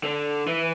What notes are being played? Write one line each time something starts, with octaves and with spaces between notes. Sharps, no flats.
D3
E3